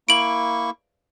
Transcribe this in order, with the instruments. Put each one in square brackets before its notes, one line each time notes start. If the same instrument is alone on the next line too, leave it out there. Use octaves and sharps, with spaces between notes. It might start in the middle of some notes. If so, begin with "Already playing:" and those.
[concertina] A#3 E4 C#6 [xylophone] D7 F#7